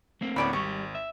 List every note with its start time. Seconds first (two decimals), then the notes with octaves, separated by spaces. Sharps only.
0.21 A3 A#3 C4
0.36 D2 A2 C#4 D5 B5 D6
0.53 G#1 G3 C#6
0.95 E5